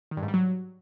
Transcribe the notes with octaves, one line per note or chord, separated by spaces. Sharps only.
D#3
G2
G#2
G3
F#3